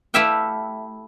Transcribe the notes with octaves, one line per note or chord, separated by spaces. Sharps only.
A3 E4 G4 E5 F5 G5